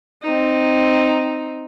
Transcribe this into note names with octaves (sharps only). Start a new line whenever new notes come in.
C4 D#4